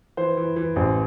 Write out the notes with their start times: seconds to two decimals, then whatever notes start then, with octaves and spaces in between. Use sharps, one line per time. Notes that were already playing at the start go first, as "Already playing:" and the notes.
0.17 E3 C5
0.37 E3
0.56 E3
0.76 A1 C5